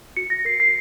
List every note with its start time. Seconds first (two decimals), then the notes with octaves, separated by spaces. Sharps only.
0.17 F#4 C#7
0.30 A#6
0.45 A#4 C7
0.60 C7